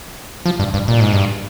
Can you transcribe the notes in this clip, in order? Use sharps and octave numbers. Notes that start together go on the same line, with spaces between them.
F3
G2
G2
A#2
G#2
G2